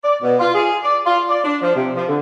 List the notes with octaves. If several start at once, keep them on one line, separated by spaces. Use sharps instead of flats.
D5
B2
F4
G#4
D5
F4
D5
D4
F3
C3
F3
D3